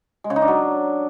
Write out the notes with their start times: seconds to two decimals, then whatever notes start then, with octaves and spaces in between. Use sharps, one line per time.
0.24 G#3
0.30 C#3
0.36 D#4
0.42 D4
0.48 F#3